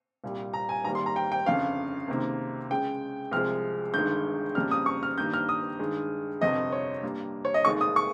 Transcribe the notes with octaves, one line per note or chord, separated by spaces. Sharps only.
C2 A#2 G3
A#5
G#5
G#1 G#2 D#3 G3 A#3 A#5
C6
A#5
G5
G5
G1 F2 C#3 F5
C#2 C3 D#3 A#3
C#2 C#3 G#3 G5
C2 C3 F3 G#3 F6
G1 G2 D#3 G#3 G6
F2 C#3 G3 A#3 F6
D#6
C#6
F6
G2 D#3 G3 A#3 G6
F6
D#6
G2 D#3 G#3
G1 F2 C3 D#5
C#5
G2 G3 A#3
C#5
D#5
F1 D#2 D#3 G#3 C#6
D#6
C#6